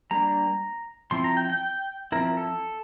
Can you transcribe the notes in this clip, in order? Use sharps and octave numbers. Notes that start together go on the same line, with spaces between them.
G3 A#3 D4 A#5
F3 C4 E4 C6
A#5
G5
G5
F3 C4 E4 A#4
A4